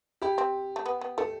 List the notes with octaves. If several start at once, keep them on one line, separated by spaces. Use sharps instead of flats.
E4 G4
C4
A3
B3
B3
A3 A4